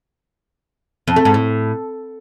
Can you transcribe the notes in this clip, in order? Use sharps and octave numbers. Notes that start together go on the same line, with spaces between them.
F2
A3
G#2
A2